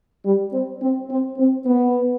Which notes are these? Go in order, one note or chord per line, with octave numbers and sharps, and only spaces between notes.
G3
C4
C4
C4
C4
B3